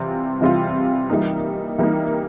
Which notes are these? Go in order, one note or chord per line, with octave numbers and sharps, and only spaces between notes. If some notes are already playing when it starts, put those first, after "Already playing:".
Already playing: C3 E3 G3 C4 F4
C3 E3 G3 C4 F4
E3 G3 A#3 D#4
E3 G3 A#3 D#4